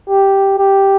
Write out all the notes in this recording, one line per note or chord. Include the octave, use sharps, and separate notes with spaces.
G4
G4